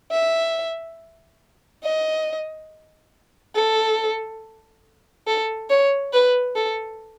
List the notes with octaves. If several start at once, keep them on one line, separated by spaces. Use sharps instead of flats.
E5
D#5
A4
A4
C#5
B4
A4